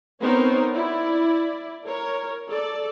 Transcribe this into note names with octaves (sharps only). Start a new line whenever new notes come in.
B3 C4 D#4 A#4 C5 C#5
E4 D5
A#4 C#5
A4 D5